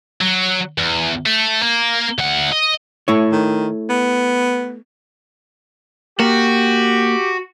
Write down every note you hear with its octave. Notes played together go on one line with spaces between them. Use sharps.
F#3
E2
A3
A#3
D2 F#5
D#5
A3 E4 C#5
D#3
B3
A#3 F#4 G4